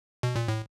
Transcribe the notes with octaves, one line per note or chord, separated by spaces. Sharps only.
B2
A#2
A2